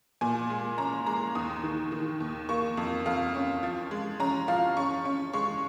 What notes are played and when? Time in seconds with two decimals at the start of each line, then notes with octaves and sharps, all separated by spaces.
0.21 A#2 G#5
0.50 G#3
0.78 C#4 A#5
1.06 G#3 A#5
1.35 D#2 D#6
1.64 D#3
1.92 D#3
2.20 D#2
2.49 A#3 C#6
2.77 F2
3.06 F2 F5
3.35 C#4
3.63 F3
3.91 G#3
4.20 C#4 A#5
4.48 F3 F5
4.77 C#4 C#6
5.05 C#4
5.33 G#3 C#6